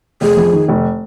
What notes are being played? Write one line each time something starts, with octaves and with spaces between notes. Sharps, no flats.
F1 G#4
F2
D#3
F1